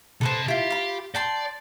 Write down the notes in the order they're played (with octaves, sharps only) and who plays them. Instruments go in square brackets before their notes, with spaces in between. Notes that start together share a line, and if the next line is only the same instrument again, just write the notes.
[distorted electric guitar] C3 A5 [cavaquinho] A4 B4 C5
[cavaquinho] E4 F4 [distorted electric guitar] G4
[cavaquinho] F4 B5
[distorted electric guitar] D5 [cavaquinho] G5 A5 C6